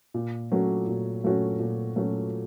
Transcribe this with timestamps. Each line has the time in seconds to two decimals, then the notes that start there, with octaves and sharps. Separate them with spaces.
0.14 A#2
0.52 F#3 A3 C#4 F#4
0.87 A#2
1.24 F#3 A3 C#4 F#4
1.60 A#2
1.96 F#3 A3 C#4 F#4